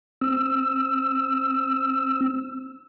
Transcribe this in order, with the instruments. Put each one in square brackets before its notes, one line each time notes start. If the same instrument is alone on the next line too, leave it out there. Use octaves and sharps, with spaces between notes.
[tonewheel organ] C4 E6